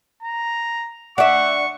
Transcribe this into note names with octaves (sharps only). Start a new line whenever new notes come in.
A#5
D4 E5 F#5 C#6